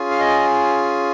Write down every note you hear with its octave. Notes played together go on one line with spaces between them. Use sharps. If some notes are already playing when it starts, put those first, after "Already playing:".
Already playing: C#4 F4 G#4
F5
D#5